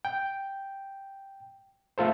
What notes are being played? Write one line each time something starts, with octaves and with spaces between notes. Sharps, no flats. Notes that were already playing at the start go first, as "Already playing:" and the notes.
G5
A3 F4 A4 C5